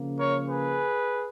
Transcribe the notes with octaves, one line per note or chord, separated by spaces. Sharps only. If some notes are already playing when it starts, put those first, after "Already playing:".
Already playing: C#3 F3 A#3
A#4 C#5
G#4 B4